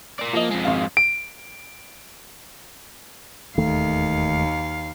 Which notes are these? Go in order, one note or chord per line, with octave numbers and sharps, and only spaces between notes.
A#4 D5
F3 A#3 D#5
F2 G#3
G#1 F5
D7
E1 D#2 D#3 A3 F5